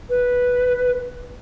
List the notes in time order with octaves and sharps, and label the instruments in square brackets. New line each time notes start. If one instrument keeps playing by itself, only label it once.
[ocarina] B4